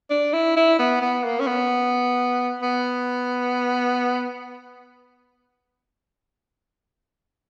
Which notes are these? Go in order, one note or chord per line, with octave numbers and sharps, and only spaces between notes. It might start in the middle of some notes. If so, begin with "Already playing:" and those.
D4
E4
E4
B3
B3
A#3
C#4
B3
B3